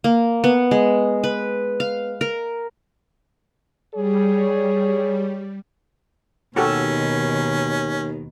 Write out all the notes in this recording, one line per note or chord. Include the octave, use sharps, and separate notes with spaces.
A#3
B3
G#3
B4
F5
A#4
G3 G#4 C#5
D#2 B2 D#3 C#4 F#4 G4 A4